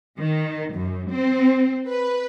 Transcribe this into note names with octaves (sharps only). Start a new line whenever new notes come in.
D#3
F#2
C4
B4